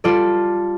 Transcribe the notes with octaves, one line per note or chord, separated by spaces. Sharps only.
G3 F4 A4 D5